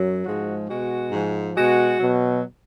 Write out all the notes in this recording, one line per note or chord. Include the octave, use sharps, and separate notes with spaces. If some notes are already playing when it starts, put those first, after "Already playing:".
Already playing: F#2 F#3
G#2 F3 G#3 F#4
B2 G#3 F#4
G#2 F3 G#3
B2 G#3 F#4
B2 F#3